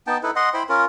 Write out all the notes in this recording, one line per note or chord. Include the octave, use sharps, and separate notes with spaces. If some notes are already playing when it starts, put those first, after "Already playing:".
B3 D#4 G5 A5
D#4 E4 A4 B4
D#5 F#5 C6
E4 C5 G5 B5
C#4 F4 A#4